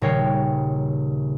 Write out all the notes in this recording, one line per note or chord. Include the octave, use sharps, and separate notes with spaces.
D#1 C#3 A#4 C#5 G5 C7